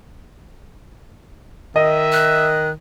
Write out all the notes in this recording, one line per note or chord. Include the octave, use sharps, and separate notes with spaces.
D#3 D#5 E5
F#6